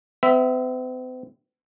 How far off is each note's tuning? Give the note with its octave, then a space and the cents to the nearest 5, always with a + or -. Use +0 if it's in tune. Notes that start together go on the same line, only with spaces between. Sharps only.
C4 -45 E5 +0